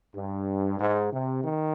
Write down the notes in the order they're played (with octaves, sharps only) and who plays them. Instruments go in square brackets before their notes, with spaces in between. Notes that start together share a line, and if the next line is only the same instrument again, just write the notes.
[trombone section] G2
G#2
C3
D#3